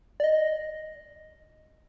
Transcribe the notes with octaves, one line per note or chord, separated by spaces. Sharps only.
D5
D#5